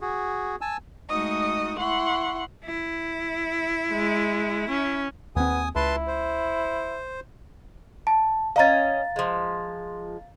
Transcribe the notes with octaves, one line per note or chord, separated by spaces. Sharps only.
F#4 G#4
G#5 A5 E6
G#3 A3 D#4 F#4 D#5 D#6
E4 F#5 C6 C#6
E4
G#3
C#4
D#2 B3 C4 G#5 D#6
C#2 E4 B4 A5 C6
C5
A5
C#4 D#5 F5 A#5 A6
F3 G#3